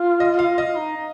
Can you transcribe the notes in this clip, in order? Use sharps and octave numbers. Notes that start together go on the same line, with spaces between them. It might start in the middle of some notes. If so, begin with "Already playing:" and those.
Already playing: F4
D#5
F5
D#5
F4
D#4
D#4